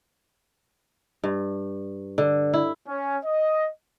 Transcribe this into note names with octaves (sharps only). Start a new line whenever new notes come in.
G2
D3
E4
C#4
D#5